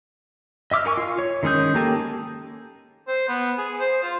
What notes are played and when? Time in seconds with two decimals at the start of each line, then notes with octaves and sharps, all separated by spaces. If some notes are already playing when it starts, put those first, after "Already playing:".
0.71 D#5 E5 D6 E6 F6
0.85 D#4 A#4 G#5 C#6
0.97 F4
1.19 C#5
1.43 D#3 G#3 C#4 G#4 G6
1.75 A#3 G4 A4 G#5
3.08 C5
3.28 B3
3.58 G#4
3.80 C5
4.03 F4